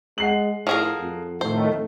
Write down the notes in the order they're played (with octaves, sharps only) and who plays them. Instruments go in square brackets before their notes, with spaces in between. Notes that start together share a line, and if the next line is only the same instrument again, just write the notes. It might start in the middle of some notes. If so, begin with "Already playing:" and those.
[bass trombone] G#3 [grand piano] F#5 C7 F#7
[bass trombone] A2 [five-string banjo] F3 G#4 A#4
[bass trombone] F2
[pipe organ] A2 D#3 A3 [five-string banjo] C5